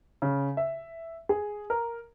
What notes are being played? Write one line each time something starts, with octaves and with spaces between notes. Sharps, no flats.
C#3
E5
G#4
A#4